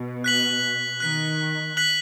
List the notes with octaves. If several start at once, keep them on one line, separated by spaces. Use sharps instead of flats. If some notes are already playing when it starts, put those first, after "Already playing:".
Already playing: B2
F#6 B6 F#7
D#3 F#6 B6 F#7
F#6 B6 F#7